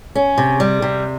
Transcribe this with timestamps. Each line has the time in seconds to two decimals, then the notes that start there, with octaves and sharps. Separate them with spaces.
0.15 C#4
0.38 C3
0.60 G3
0.82 C3